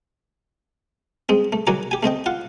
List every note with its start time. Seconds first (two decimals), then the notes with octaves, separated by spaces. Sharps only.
1.29 G#3 C4
1.53 A3
1.67 D#3 F#3 F#4 G#5 A#5 D6
1.91 G4 G#5
2.03 A3 C4 D#5 G5
2.26 F4 F#5